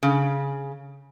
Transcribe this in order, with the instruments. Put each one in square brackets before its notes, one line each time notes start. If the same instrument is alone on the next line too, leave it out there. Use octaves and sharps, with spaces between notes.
[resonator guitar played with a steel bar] C#3